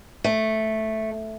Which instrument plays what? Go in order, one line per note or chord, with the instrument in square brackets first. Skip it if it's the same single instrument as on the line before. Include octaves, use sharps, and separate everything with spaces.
[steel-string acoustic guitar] A3